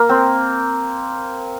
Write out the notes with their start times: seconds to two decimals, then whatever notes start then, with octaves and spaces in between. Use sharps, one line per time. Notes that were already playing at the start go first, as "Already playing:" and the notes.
Already playing: A#3
0.09 C4